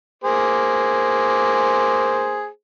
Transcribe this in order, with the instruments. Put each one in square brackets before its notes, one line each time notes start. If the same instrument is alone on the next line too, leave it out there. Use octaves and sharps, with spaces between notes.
[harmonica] A#3 G#4 C5